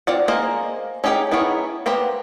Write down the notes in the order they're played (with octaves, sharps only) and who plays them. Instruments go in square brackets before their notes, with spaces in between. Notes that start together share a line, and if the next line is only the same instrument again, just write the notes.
[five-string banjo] C4 F4 D5 F#5
A#3 G#4 A#4 C5 D#5
C#4 D#4 G4 G#4 G5
B3 E4 G#4 A#4 C#5
A#3 B3 G4 C5 A#5